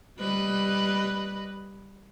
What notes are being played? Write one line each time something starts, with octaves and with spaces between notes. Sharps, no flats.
G3 B4 D#5